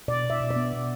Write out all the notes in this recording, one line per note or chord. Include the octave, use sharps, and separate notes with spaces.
B2 D5
B2
E5
B2
D5
B3
B2